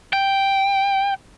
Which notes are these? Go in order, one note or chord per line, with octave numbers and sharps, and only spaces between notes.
G5